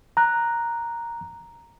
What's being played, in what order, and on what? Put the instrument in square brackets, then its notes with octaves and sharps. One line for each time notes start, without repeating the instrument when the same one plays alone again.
[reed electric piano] A#5 F#6